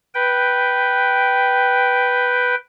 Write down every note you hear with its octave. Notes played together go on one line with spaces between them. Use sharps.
B4 G5